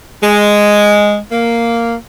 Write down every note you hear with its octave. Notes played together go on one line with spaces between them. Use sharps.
G#3
A#3